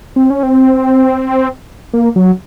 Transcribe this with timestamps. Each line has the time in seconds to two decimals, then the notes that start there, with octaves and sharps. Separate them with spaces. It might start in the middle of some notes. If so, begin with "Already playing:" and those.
0.16 C4
0.30 C#4
0.43 C4
1.93 A#3
2.16 F#3